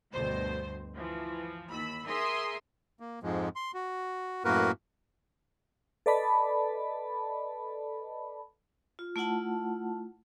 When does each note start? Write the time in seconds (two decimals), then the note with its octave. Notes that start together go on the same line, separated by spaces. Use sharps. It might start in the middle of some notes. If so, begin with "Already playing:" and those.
0.14 D2 G2 B2 C5
0.95 E3 F3
1.72 D#2 B5 E6
2.08 G#4 A#4 E5 C6 D#6
3.00 A#3
3.23 F2 G#2 F3 G#3
3.56 C6
3.74 F#4
4.45 F#2 A2 A#3 F#4 A#4 B4
6.06 A4 B4 D5 D#5 A5 B5
8.99 F4
9.16 A3 E4 F4 F#5 A5